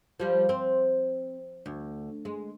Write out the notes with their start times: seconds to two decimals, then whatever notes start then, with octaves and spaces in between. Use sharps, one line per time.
0.20 F3 G3
0.49 C4
1.66 D2
2.25 G#3